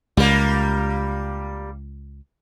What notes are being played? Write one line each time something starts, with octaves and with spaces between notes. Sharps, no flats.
C#2 G3 A#3